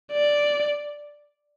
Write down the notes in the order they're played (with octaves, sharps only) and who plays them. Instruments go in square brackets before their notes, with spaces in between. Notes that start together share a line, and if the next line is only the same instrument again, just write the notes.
[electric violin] D5